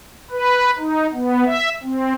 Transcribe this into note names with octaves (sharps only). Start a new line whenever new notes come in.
B4
D#4
B3
E5
C4